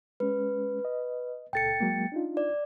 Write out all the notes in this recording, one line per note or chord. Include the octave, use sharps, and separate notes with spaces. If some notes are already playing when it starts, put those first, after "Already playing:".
G#3 C#4 B4
D#5
C#2 A#2 A4 G5 A6 C#7
F#3 G#3 A#3
D4 D#4 F4
D5